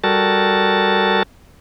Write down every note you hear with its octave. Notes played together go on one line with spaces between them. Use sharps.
G3 F#4 A4 A#4 A5